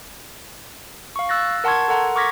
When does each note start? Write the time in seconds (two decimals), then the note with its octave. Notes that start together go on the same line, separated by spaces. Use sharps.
1.16 F5 C#6
1.29 E6 F#6 A6 A#6
1.64 A#4 F#5 A5 C6 C#6 G#6
1.88 A4 A#4 F#5 A#5 C6
2.16 C#6 D6 F6 G#6 A#6 B6